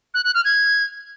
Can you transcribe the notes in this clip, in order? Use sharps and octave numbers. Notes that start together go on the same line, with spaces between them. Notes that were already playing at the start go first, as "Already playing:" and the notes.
F#6
F#6
F6
G#6